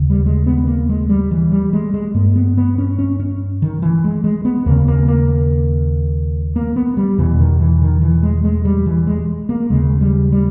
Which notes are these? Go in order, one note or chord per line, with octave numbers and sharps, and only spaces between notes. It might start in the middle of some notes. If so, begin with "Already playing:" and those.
Already playing: D#2 C#3
G3
G#3
B3
A#3
G#3
G3
E3
G3
G#3
G#3
G2 A#3
B3
B3
C#4
C#4
C#4
D#3
E3
G#3
G#3
B3
D#2 C#3 A#3
A#3
A#3
A#3
B3
G3
E2 B2 E3
D#3
E3
D#3
E3
G#3
G#3
G3
E3
G#3
A#3
D#2 C#3 G#3
G3
G3